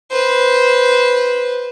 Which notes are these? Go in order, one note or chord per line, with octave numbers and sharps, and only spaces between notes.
B4 C5